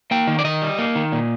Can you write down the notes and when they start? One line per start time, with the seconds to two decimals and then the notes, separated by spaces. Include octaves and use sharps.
0.11 A#3 G5
0.27 D#3
0.39 D5
0.44 D#3 D#5
0.62 G3
0.79 A#3
0.95 D#3
1.12 A#2